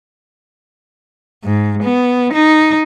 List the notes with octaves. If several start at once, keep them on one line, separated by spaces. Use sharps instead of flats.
G#2
B3
D#4